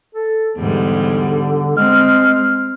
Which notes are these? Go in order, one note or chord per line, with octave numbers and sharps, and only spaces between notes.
A4
E2 G#2 D3 G3
G#3 C4 F6